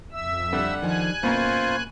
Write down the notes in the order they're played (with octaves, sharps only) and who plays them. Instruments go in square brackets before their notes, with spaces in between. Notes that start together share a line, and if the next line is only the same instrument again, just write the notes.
[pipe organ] F2 E5 E6
[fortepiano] D3 G3 G4 [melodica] F#5
[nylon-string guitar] D#3 F3 [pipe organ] G#5 F#6
[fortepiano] F#2 B2 A#5 [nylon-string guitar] A#3 [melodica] F4 C5